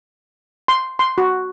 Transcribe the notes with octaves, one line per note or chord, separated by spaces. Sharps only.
C6
C6
F#4